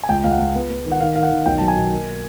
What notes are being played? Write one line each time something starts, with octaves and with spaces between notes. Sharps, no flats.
G#5
C#2 G5
C#2 F5
F#5
C#2
B3
B3
D#3
F#5
D#3 F5
D#3 F5
F#5
D#3
B1 G5
F#3 A5
G#5
B2
A#3